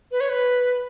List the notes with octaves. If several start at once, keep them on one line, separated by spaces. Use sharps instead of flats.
B4
C#5
B4